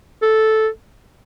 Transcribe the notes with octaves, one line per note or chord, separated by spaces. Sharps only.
A4